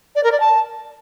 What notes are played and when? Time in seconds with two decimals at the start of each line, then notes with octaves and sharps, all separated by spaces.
0.15 D5
0.24 A#4
0.32 D5
0.40 A5